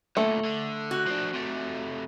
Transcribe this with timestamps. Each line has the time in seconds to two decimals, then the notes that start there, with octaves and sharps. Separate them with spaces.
0.17 D2 A#2 A3
0.45 D3
0.91 F#4
1.07 F3 D4
1.34 C3 A3